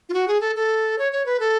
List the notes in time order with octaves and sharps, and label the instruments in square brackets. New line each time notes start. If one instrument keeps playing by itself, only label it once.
[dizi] F4
F#4
G#4
A4
A4
C#5
C#5
B4
A4